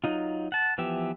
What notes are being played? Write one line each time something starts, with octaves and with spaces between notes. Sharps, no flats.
F#3 D#4 F4
F#5 A5
E3 F3 B3 G4 E5